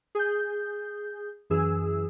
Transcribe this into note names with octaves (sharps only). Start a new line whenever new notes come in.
G#4 G6
F#2 E3 G#4 E6